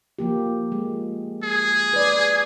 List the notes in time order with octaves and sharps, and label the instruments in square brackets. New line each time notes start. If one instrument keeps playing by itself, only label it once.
[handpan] F3 A#3 G4
G#3
[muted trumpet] G#4
[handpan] B4 D5